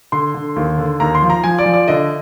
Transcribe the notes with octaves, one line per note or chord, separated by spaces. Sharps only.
D3 C6
D3
D#2
D3
D#2 A#5
C6
F3
A#5
F3 G#5
D5
F3
D5
D3 D#5